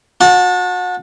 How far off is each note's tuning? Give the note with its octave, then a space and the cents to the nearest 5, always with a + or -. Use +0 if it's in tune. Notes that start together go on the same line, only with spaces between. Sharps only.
F#4 -35 A5 +5